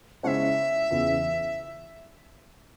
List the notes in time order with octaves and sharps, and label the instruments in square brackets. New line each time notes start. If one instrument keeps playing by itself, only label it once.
[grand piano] C#3 G#3 C#4 E4 C5 [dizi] E5 F#5
[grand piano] E2 C#3 E3